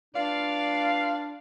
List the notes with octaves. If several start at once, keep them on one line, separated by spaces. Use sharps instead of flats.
D4 F4 B4 D5 F5